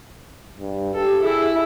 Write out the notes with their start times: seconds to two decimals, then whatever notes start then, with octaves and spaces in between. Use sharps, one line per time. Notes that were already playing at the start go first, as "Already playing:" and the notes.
0.59 G2
0.95 G4 A4
1.23 E4 G#4